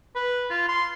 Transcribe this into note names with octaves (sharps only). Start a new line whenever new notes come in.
B4
F4
C6